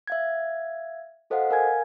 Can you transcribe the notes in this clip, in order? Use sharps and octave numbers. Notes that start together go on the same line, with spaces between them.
E5 F5 G#6
F#4 A4 C5 D#5 F5 F#5
A#4 F5 G#5 G#6